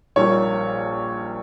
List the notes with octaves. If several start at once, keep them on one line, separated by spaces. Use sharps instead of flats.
A#1 A#2 G3 A#3 C#5